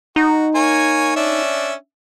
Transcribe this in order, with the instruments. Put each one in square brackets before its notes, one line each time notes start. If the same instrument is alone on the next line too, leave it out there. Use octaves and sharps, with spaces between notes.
[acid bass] D#4 [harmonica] F#4
[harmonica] A#3 C#5 G#5
C#4 D4 E5